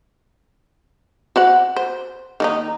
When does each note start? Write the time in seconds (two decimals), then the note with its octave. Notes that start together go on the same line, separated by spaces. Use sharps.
1.36 F#4 C5 F#5
1.76 C5
2.40 D#3 A#3 D#4